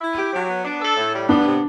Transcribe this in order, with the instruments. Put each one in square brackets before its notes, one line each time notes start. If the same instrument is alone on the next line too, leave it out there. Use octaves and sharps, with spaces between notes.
[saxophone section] E4
G4
F#3
B3
D4
A4
A2
G3
[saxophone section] B3 [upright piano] D4
[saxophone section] C3